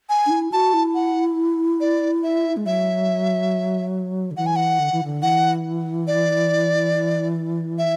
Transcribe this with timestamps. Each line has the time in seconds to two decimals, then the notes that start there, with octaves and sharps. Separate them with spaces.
0.09 G#5
0.26 D4
0.30 E4
0.52 F#4 A5
0.74 E4
0.95 F#5
1.80 D5
2.23 E5
2.57 G#3
2.66 F#3 E5
4.31 D3
4.37 E3 F#5
4.46 G#5
4.56 F#5
4.79 D3
4.92 E3
5.04 D3
5.22 E3 F#5
6.07 D5
7.78 E5